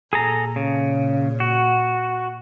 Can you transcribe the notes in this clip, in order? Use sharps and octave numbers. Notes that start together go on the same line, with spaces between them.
A#2 G#4 A4 A#5
C#3
F#4